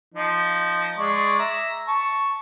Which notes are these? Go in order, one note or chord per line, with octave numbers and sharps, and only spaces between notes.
F3 D#4
G#3 D5 C#6
E5 A#5
A5 C#6